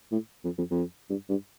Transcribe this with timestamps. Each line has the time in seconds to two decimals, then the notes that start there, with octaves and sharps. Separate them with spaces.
0.12 A2
0.44 F2
0.58 F2
0.71 F2
1.10 G2
1.29 G2